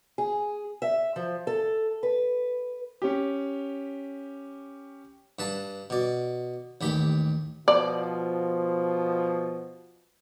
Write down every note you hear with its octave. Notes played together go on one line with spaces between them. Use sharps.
G#4
E5
F3
A4
B4
C#4 G4
G2 B4 A5
B2 D5
A1 D#2 G4 B5
B2 F3 D5